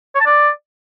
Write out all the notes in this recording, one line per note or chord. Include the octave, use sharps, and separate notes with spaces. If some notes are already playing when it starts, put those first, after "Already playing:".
C#5
A5
D5